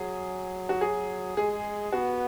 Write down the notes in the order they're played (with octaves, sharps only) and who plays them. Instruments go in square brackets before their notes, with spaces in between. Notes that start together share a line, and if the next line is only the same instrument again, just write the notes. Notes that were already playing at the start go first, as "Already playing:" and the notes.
Already playing: [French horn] F#3 [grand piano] G#4
[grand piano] F#4
G#4
[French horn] G#3 [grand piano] G#4
[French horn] B3 [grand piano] F#4